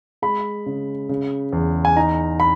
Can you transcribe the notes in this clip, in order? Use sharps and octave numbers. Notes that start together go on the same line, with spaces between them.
G#3 B5
C#3
C#3
E2
G#5
D#4 A#5
B5